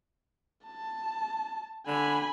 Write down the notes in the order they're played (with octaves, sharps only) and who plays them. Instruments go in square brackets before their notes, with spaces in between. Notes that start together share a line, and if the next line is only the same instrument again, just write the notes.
[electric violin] A5
[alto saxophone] D3 [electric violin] G#5 B5